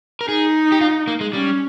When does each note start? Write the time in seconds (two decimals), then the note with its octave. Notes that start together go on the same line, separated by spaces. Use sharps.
0.21 A#4
0.28 D#4 G#4
0.72 G4
0.81 F4
1.07 A#3
1.21 G#3
1.33 G3 C#4